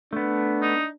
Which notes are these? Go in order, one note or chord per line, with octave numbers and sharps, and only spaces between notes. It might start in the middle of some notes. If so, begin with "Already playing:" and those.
A3 B3 D4
D#4